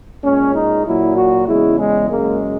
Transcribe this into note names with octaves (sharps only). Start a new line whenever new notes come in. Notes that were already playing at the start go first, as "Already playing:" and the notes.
A#2 G#3 C#4
D#4
A#2 F#3 E4
F#4
E2 C#3 G#3 E4
G#3
F#2 C#3 G#3 A#3